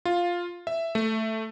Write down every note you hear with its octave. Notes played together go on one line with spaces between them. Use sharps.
F4
E5
A3